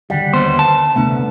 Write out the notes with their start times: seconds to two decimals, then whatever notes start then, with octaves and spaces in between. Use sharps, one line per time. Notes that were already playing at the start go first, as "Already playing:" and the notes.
0.10 D3 D#3 G3 F#5
0.33 D#2 B3 C5
0.59 A5
0.96 C3 A3 B3 D4
1.11 C2